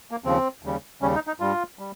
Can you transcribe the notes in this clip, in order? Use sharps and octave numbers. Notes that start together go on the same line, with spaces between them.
A#3
D#2 C#3 F3 C4
D#2 C#3 G3
D#2 C#3 G3 C#4
D#4
D#4
G2 G3 F4
G3